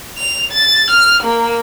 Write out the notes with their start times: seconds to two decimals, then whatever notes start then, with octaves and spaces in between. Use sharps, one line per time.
0.18 F7
0.52 A6
0.91 F6
1.23 A#3